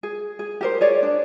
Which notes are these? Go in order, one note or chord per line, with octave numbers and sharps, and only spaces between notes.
G#4
G#4
G4 A#4 C5
G#4 C#5 D5
D4